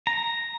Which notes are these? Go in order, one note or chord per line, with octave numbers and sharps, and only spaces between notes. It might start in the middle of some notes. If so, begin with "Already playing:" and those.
A#5